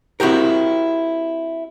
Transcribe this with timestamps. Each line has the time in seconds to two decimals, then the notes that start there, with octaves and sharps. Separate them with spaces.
0.20 C4 E4 F#4 G4 A#4